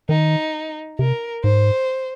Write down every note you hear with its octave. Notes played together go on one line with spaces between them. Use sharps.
D#3 D#4
C3 A#4
G#2 C5